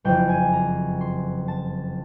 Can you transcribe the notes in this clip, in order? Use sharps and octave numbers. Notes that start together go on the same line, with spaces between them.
F#1 F2 C#3 G5
G#5
A#5
C6
A5